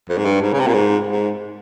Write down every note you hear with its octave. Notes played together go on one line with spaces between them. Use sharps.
F2
G#2
G2
G#2
C#3
C3
A#2
G#2
G#2